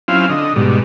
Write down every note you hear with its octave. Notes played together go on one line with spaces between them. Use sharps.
F#3 C4 C#4 E4 F4 F5
D3 D#5
G#2 B2 G3